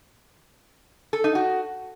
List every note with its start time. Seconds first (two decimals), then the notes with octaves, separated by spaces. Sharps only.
1.13 A4
1.24 D#4
1.35 F#4